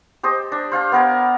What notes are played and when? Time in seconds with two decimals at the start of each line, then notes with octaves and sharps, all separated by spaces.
0.23 G4 C5 D#5 A5
0.52 D4
0.72 C5 F5 G5 A5
0.92 B3 A#4 G#5